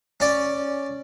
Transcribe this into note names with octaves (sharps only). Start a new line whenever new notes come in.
C#4 D5